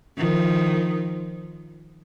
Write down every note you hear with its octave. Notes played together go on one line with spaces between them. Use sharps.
D#3 F3